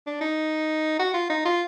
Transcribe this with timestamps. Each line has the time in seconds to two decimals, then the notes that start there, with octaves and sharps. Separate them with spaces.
0.07 D4
0.21 D#4
0.99 F#4
1.14 F4
1.30 D#4
1.45 F4